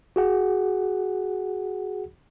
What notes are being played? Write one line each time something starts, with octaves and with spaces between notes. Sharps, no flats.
F#4 G#4 F#5